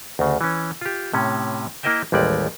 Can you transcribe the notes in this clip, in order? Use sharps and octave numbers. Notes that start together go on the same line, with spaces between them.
D2 C#3
E3 C#4
F4 G4
A2 C3 C#4
A#3 E4 A#4 D#5 E5 G5
A1 D#2 G3 G#3 D5